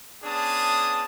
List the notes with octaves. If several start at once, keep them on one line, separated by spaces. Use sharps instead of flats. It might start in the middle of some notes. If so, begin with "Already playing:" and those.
B3 C#4 D4 G#4 A5 D#6